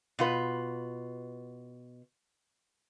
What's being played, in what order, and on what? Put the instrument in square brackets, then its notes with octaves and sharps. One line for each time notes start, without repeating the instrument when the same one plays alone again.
[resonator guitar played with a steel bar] B2 F4 B4